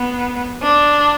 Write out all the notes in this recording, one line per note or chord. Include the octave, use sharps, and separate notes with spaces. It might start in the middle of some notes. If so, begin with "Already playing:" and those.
Already playing: B3
D4